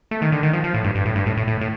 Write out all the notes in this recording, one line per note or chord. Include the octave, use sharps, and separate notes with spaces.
A3
D#3
D3
D#3
F3
F3
A2
G2
G2
A2
G2
A2
A2
A2
A2